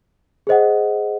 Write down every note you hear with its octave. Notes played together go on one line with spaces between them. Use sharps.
G#4 C5 D#5 F#5